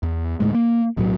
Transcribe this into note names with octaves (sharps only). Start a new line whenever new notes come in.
E2
D2 A2 G#3
A#3
B1 A2 E3 F#3